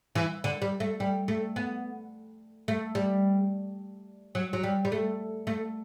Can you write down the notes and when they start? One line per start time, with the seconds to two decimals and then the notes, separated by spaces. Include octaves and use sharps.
0.15 E3
0.44 D3
0.62 G3
0.80 A3
1.00 G3
1.28 A3
1.56 B3
2.68 A3
2.95 G3
4.35 F#3
4.53 F#3
4.63 G3
4.85 G3
4.92 A3
5.47 A3